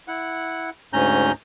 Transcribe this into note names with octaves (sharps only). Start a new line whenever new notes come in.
E4 F#5
D2 G#2 C#4 A#5 G6